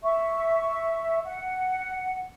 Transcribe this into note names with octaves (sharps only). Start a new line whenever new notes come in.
E5 C#6
F#5